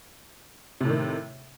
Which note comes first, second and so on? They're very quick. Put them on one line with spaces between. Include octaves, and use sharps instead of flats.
C3 A2 D#3